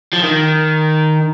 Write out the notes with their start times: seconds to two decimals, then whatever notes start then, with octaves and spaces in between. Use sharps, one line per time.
0.13 F3
0.23 D#3